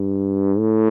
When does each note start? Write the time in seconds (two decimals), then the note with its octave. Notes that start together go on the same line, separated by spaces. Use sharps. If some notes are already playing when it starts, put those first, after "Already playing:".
Already playing: G2
0.59 A2